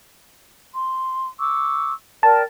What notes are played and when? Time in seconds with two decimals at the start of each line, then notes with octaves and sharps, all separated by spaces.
0.74 C6
1.40 C#6 D6 E6
2.23 A#4 D5 G5 A5